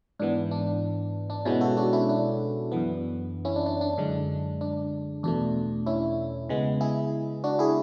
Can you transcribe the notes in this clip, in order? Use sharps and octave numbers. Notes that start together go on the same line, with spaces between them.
G#2 E3 B3 D4
D4
D4
B2 G#3 B3 C#4 E4
F#4 A4
D4 F#4
C#4 E4
D4
F#2 E3 B3
C#4 E4
D4
D4
D4
F#2 D3 G#3
D4
E2 B2 A3 D4
C#4 E4
C#3 G#3 B3
E4 G#4
D4 F#4
E4 G#4